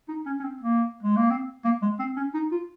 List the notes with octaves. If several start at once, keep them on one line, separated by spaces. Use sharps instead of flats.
D#4
C#4
C#4
C4
A#3
G#3
A#3
C4
A#3
G#3
C4
C#4
D#4
F4